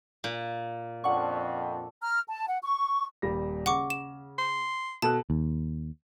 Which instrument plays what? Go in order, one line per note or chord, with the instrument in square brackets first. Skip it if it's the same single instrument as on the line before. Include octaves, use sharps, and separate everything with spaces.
[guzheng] A#2
[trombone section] F2 [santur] C#4 D4 A4 [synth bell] F#5 C#6
[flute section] A#5 F6
A5
F#5
C#6
[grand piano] D#1 G3 A#6
[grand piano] C#3 [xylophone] F#5 C#6 D6
[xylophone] E7
[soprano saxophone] C6
[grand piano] B2 A4 F#6 [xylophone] A5
[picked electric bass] D#2